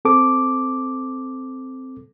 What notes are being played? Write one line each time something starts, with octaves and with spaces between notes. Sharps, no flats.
C4 A4 D6